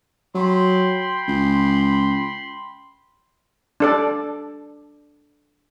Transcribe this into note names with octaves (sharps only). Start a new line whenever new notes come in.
F#3 G5 B5 C6
C#2
D4 A4 D5